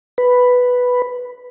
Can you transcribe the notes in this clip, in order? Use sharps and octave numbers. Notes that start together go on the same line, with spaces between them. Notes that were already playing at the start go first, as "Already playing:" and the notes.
B4